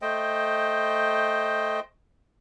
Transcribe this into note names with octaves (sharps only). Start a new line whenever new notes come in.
A3 C5 D#5 G5